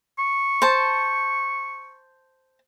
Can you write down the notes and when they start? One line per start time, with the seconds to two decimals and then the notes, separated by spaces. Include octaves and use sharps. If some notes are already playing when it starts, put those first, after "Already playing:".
0.19 C#6
0.62 C5 A5